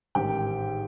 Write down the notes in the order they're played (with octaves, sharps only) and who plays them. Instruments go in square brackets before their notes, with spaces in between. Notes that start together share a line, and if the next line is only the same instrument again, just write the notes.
[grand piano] A1 G#2 D#3 G4 G5